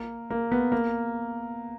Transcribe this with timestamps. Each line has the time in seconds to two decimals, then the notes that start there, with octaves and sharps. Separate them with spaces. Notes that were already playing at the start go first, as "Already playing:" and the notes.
Already playing: A#3
0.30 A#3
0.52 B3
0.72 A#3